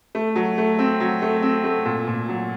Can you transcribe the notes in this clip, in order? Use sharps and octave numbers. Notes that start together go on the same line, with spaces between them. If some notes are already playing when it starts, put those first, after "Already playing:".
A3
F#3
A3
C4
F#3
A3
C4
A3
A#2
A#2
F#3